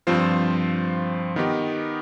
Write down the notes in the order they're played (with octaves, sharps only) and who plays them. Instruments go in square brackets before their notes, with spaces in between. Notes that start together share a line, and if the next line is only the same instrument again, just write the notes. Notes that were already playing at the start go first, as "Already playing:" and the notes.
[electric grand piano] G2 F3 C4 F4 C5
D#3 B3 D#4 G4